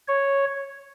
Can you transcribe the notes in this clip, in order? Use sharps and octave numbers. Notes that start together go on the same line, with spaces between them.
C#5